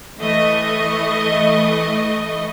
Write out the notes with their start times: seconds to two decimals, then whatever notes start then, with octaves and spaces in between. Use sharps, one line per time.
0.20 E3 A3 D#5 C#6